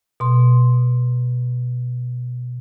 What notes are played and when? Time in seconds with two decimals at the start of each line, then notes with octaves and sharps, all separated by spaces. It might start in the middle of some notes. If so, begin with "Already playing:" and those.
0.20 B2 C6